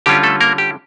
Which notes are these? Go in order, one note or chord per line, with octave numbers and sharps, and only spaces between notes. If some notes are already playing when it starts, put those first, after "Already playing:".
D3 G3 C#4 F4 G4
A3 A4
A#3 A#4
G4